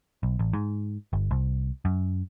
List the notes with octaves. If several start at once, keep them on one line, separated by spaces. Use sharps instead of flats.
B1
A1
G#2
G1
C2
F#2